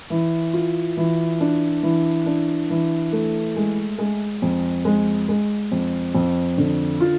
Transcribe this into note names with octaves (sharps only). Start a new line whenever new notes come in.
E3
F4
E3
D4
E3
D4
E3
A3
G#3
G#3
F2
G#3
G#3
F2
F2
D3
F4